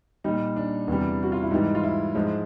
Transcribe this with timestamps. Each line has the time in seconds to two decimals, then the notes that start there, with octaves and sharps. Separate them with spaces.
0.24 A#2 G3 D#4
0.56 D4
0.88 E2 C3 E3 G3
1.23 F#4
1.32 F4
1.42 E4
1.51 G#2 E3 G3 D#4
1.75 F4
1.84 E4
2.15 G#2 F3 G#3